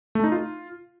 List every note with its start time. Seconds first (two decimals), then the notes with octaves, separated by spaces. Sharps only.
0.15 A3
0.24 D#4
0.32 F4